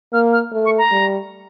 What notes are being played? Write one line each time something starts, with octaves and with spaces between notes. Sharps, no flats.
A#3 F6
F6
A3
C#6
A#5
G3